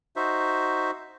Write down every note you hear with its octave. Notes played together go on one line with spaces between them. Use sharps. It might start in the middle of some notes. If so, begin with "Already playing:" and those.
D#4 F#4 C5 E5